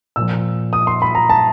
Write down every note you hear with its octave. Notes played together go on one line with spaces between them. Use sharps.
A#2 F3 E6
D#6
C6
B5
A#5
A5